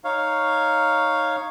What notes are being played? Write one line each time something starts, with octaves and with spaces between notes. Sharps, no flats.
D#4 C#5 F5